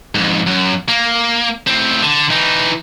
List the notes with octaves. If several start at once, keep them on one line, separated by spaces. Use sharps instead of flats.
F2 G#2
F#2
A#3
A2 C4
D3
E3 D#4